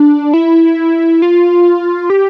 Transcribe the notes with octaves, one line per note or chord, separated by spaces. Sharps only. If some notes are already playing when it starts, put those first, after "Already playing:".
Already playing: D4
E4
F4
G4